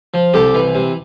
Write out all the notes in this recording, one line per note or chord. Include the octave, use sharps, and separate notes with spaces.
F3
C2 G4 A4
E3
C3